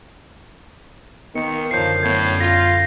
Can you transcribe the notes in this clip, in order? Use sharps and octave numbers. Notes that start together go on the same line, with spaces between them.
D#3 B3 A#4 C#7
F#2 D3 F3 A#4 C#5 G6 C7
A2 B3 G#6
F4 A#6